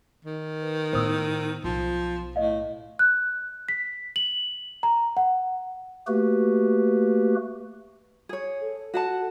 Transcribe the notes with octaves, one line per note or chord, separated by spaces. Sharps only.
D#3
B4
A2 B3 C5 D#6 E6
B1 F3
A2 D#5 F5
F#6
B6
F#7
A#5
F#5
A3 A#3 F#4 G4 B4
G#4 C#5
A4
F#4 F#5 A5